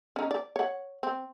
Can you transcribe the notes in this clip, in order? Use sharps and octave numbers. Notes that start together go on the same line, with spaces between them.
C#4 D#4
D5
C#5 F#5
C4